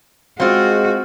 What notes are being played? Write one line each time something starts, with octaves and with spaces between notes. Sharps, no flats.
G#3 C4 F4 F#4 C5 F5